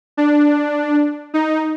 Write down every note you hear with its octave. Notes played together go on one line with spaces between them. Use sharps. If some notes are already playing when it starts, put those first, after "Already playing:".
D4
D#4